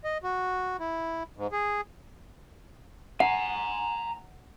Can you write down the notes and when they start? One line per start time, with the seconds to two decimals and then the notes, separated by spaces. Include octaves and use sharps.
0.04 D#5
0.23 F#4
0.80 E4
1.37 G#2
1.52 G#4
3.20 F#5 G#5 A#5